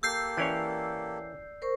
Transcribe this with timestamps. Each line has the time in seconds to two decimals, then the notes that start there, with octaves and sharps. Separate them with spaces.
0.03 A#3 G4 A4 E6 G6 C7
0.37 E3 C#4 C#5 D5
1.62 A#4 C5 C#6